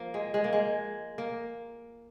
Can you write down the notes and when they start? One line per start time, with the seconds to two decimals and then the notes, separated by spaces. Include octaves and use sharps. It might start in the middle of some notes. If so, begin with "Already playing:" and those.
Already playing: F3 A#3
0.14 G#3
0.34 G#3
0.44 A#3
0.53 G#3
1.18 A#3